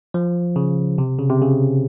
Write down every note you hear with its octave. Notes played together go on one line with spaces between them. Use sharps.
F3
C#3
C3
C#3
C3
C#3